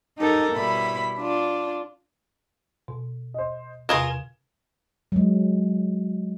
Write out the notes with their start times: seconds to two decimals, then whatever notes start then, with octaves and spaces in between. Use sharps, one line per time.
0.19 D#4 G4 A4 A#4
0.53 B2 G3 E4 B5
1.18 D4 F4
2.88 B2
3.34 C5 D#5
3.89 E2 C3 F4 G#4 A#4 G#6 E7 G7
5.12 F#3 G#3